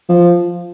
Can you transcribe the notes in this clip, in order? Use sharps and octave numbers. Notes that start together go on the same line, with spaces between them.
F3